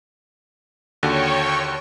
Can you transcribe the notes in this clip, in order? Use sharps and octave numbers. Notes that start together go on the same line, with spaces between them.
D#2 D3 F#4 C#5 G5 C#6